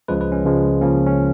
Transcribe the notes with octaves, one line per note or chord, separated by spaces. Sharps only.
C#2 C#3 F3 G#3 B4
B4
C#4
C#2 C#3 F3 G#3
C#2 C#3 F3 A#3 C#4
C#4